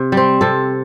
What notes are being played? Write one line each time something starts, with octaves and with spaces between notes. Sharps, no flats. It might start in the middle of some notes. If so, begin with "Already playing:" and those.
Already playing: C3
G3 C4
C3 A4